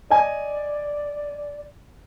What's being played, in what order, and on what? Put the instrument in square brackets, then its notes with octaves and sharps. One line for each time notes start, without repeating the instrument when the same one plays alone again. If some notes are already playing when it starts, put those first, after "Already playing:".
[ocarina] D5 [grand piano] D#5 G#5